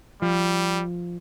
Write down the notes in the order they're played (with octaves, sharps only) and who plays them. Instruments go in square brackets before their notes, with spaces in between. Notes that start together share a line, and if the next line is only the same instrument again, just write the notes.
[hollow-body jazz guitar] F3 [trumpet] G3